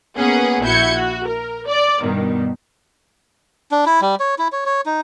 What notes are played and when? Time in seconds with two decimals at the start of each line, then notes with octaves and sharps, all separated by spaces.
0.17 A#3 B3 C#4 G#4 F#5
0.63 A#1 E4 F#4 G6 G#6 C#7
0.94 F#4
1.26 A#4
1.67 D5
2.00 G2 B2 D#3
3.71 D4
3.86 E4
4.02 G3
4.20 C#5
4.39 E4
4.52 C#5
4.66 C#5
4.86 D#4